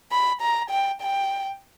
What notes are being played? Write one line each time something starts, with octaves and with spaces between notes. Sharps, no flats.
B5
A#5
G5
G5